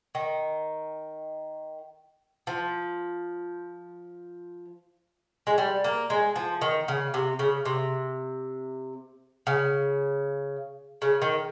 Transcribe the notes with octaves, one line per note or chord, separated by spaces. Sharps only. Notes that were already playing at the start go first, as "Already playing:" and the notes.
D#3
F3
G#3
G3
A#3
G#3
F3
D#3
C#3
C3
C#3
C3
C#3
C#3
D#3